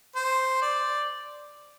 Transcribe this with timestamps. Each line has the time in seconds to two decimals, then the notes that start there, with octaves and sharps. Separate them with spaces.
0.16 C5
0.62 D5